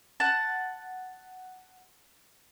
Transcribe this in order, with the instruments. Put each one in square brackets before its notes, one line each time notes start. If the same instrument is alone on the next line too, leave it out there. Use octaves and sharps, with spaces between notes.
[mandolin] F#5 A5